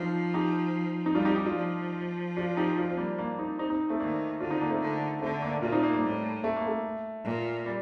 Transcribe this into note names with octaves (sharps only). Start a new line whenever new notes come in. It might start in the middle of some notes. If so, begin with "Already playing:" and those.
Already playing: F3 C4 D4 D#4 F4
D#4 G4
D#4
G3 D4 F4
D#4 G4
D#4 G4
D4 F4
F3
D4 F4
D#4 G4
D4 F4
C4
G3 A#3
A#3 D4
C4 D#4
C4 D#4
C4 D#4
A3 C4
D#3 A#3 D4
D3 D4 F4
C4 D#4
A#3 D4
A3 C4
D3
D3 A3 C4
A#3 D4
A#2 D4 F4
C4 D#4
A#3 D4
G3 A#3
A2
A3
A#3
A3
A#2
G3